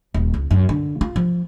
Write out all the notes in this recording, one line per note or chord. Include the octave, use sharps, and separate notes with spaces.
D#1
C#2
F#2
D3
F4
F3